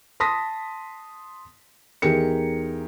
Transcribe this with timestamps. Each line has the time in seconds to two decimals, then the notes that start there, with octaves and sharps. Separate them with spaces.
0.20 A5 C6 D#6 A#6 B6
2.02 E2 D#4 G4 G#4 A#4 C#7